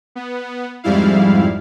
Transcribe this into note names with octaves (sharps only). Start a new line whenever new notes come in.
B3
F2 G#2 G3 E4 F5